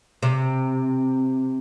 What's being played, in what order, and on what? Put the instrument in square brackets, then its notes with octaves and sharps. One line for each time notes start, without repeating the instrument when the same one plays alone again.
[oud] C3